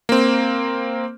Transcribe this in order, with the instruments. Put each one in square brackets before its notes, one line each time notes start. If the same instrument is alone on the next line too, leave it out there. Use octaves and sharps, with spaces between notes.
[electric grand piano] A#3 C4